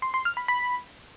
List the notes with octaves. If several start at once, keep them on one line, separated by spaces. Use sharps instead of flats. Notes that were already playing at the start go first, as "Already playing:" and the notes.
C6
C6
F6
B5
B5